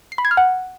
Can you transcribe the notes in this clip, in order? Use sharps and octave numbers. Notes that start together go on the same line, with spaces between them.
C7
B5
G#6
F6
F#5